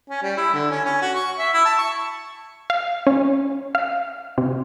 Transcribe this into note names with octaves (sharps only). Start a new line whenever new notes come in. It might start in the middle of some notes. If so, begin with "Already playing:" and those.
C#4
G3
E4
D3
C#4
C#4
F#4
C#6
E5
E4
A5
C#6
F5
C#4
F5
C3